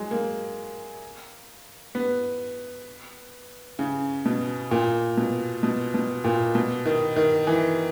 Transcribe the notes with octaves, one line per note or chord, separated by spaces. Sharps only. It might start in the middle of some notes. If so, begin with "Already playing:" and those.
Already playing: F#3 G#3
A#3
B3
C#3
B2
A#2
B2
B2
B2
A#2
B2
D#3
D#3
E3